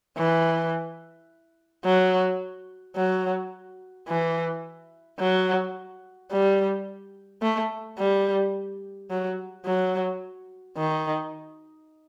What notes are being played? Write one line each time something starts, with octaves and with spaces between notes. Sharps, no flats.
E3
F#3
F#3
E3
F#3
G3
A3
G3
F#3
F#3
D#3